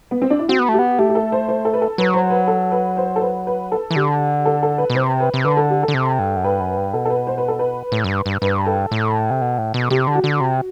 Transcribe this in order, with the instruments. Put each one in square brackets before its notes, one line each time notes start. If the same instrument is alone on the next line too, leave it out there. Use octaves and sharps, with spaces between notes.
[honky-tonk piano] B3
C4
D4
E4
[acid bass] C4 [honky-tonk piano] F#4
[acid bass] B3
A3
[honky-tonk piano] G4
[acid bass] B3
[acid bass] A3 [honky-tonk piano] G4
[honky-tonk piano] G4
A4
C5
C5
A4
B4
A4
[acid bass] F#3 [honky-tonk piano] B4
[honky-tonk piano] C5
B4
A4
B4
C5
A4
B4
B4
A4
[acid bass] E3
[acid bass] D3 [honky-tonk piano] G4
[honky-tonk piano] A4
A4
B4
[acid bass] B2
[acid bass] C3 [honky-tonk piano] C5
[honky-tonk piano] B4
[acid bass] C3
[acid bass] D3 [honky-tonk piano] B4
[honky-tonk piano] A4
G4
A4
[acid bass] D3
C3
G2
F#2
[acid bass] G2 [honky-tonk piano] B4
[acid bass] F#2
G2
[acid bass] B2 [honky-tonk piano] A4
[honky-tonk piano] A4
B4
C5
B4
A4
B4
[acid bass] A2
F#2
G2
G2
[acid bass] G2 [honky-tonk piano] B4
[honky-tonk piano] A4
[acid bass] A2
C3
B2
A2
B2
[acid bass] C3 [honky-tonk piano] G4
[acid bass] D3
[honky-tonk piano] F#4
[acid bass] D3
C3